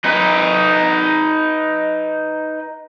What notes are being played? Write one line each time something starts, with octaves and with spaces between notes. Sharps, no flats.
D#4 B4